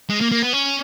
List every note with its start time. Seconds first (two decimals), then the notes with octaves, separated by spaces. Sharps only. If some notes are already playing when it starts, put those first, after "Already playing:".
0.10 G#3
0.21 A#3
0.32 A#3
0.43 B3
0.53 C#4